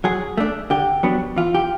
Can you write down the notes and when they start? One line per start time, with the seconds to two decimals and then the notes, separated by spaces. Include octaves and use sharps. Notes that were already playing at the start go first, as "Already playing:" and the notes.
0.04 F#3 G#4
0.37 A3 D4
0.70 D3 G4
1.03 F#3 B3 D4
1.36 E3 F4
1.55 G4